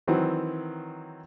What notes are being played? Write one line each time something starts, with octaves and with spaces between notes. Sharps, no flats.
D#3 E3 F#3 C4